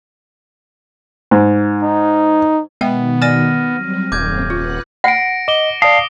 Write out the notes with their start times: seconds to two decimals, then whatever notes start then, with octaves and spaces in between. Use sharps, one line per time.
1.31 G#2
1.83 D#4
2.81 B2 D#3 G#3 B3 E5 G5
3.22 D5 G#5 F6 A#6 D#7
3.67 F#3 G3 C4
4.12 D#1 F#2 A#3 C4 D6 G6 G#6
4.50 F4 B4 F#5 F#6
5.04 F#5 A#6 C#7 D7
5.48 D#5 D6 G7
5.82 D5 F5 A5 D#6